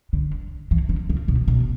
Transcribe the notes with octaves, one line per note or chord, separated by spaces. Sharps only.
D3
E3
D3
C#3
B2
B2